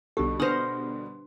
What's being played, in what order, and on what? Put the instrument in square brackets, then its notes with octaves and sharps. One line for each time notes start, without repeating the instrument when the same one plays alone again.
[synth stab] B1 A4 [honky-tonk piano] B2 D3 G3 [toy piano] G4
[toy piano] D4 B4 [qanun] C5 F#5 [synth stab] D#6 F6 A#6